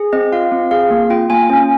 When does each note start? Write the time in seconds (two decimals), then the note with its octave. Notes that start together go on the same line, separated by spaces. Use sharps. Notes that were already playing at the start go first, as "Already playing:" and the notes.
Already playing: G#4
0.13 C4 D#5
0.32 F4 F5
0.52 C4
0.71 G#4 F5
0.91 A#3
1.10 F4 G5
1.30 A#3 G#5
1.50 C#4